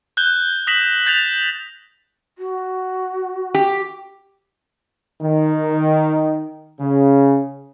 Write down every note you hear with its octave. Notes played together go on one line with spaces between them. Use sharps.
F#6 G6 G7
D#6 A#6 B6 E7 F#7
G6 A6 B6 F7
F#4
G4
D#3
C#3